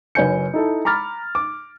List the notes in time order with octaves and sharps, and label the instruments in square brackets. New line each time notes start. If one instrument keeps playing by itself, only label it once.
[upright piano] F#1 B4 C#5 G#5 G6 C#7
D#4 E4 A4
A#5 B5 D6 F6 A6
D6